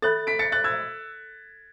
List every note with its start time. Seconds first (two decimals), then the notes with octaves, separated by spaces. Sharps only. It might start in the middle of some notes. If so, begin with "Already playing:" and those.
0.02 A4 C#5 E5 B5 F#6 A6
0.27 B6 D7
0.39 A6 C#7
0.52 F#6 A6
0.64 E6 G#6